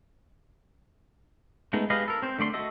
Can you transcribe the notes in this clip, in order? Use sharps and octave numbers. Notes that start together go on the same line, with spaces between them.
G#3 A3 B3 D#4
G#3 G4 B4 D#5 F5
A4 A#4
C4 C5
D3 A3 D5 C6
F#4 A4 D#5 E5